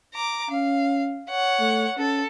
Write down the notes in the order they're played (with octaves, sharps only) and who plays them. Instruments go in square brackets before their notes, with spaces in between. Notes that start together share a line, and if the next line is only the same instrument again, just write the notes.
[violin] A#5 D6
[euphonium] C#4 [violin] F5
[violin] C#5 F#5
[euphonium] A3
[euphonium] C#4 [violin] A4